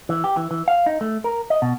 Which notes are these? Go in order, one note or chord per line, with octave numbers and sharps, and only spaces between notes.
E3
G4
E3
E3
F5
D#4
A3
A#4
D#5
B2